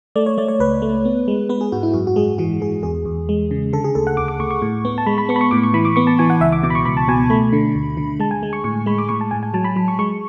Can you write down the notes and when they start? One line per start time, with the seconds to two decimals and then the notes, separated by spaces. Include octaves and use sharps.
0.16 A3 D5
0.26 C#5
0.38 A3 D5
0.48 C#5
0.60 C#2 B4
0.82 A3
1.05 B3
1.28 G#3
1.49 B3 B4
1.61 G#4
1.72 G#2 F#4
1.83 E4
1.94 F#2 F#4
2.07 F#4
2.16 G#3 G#4
2.38 E3 F#4
2.61 E3 G#4
2.83 E2 G#4
3.05 E2
3.29 G#3
3.51 C#3
3.73 D3 A4
3.84 G#4
3.95 D2 A4
4.07 F#5
4.17 D2 D6
4.28 D6
4.40 D2 C#6
4.51 C#6
4.62 A2
4.85 B3
4.98 A5
5.06 G#3 B5
5.18 B5
5.29 B3 C#6
5.36 B5
5.41 C#6
5.51 A2 D6
5.63 C#6
5.74 E3 B5
5.85 D6
5.96 B3 C#6
6.07 A5
6.19 E3 G#5
6.30 F#5
6.41 C#2 E5
6.52 D6
6.63 B2 D6
6.70 B5
6.75 C#6
6.85 C#2 B5
6.97 A5
7.08 B2 G#5
7.30 A3 B5
7.53 D3
7.75 D2
7.97 D3
8.20 G#3 A5
8.31 G#5
8.43 G#3
8.53 C#6
8.64 A2 C#6
8.86 G#3 B5
8.98 D6
9.09 A2 C#6
9.21 A5
9.31 A2 G#5
9.43 G#5
9.54 F#3 A5
9.64 B5
9.76 F#3 B5
9.88 C#6
9.99 G#3 C#6